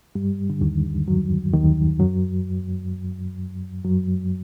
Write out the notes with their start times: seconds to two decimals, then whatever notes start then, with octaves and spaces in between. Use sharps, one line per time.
0.15 G2 G3
0.50 D3
0.61 D#2 D#3
1.08 F#2 F#3
1.54 D#2 D#3
2.00 F#2 F#3
3.84 F#2 F#3